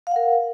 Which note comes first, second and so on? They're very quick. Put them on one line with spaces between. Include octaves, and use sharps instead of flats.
F5 F#5 A#4